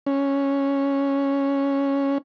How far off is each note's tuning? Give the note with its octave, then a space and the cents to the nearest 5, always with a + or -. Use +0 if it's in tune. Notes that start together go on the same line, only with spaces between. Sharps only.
C#4 +0